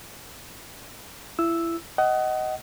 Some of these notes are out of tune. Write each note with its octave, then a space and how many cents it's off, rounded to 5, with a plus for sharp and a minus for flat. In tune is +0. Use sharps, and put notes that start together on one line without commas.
E4 +25 E6 +0
D#5 +10 F#5 +25